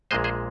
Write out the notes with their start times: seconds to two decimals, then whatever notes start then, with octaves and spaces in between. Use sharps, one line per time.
0.11 A#1 A#2 G#3 C5 D#5
0.24 G#4 C5